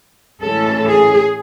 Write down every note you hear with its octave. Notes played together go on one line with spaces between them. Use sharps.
A2 E3 G#3 C#4 A4
G#4